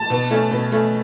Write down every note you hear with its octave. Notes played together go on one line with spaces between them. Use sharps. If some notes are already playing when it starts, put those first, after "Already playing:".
Already playing: A5
B2
A3 C#4
B2
A3 C#4